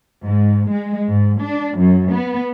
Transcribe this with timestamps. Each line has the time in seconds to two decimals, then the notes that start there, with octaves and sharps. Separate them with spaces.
0.25 G#2
0.73 G#3
1.10 G#2
1.40 D4
1.77 F#2
2.11 B3